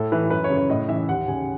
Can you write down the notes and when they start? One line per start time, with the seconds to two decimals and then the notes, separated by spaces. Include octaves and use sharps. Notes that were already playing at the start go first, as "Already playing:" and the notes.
Already playing: A2 A4
0.12 E3 B4
0.30 F#2 B4
0.44 C#5
0.50 C#3
0.57 C#5
0.70 A2 D#5
0.88 E3 E5
1.08 D#2 F#5
1.28 C#3 G#5